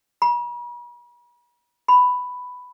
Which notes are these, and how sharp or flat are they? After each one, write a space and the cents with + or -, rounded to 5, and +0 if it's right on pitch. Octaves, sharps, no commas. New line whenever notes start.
B5 -45
B5 +5